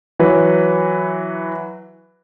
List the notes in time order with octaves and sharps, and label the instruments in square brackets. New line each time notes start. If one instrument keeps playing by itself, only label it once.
[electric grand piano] E3 F#3 B4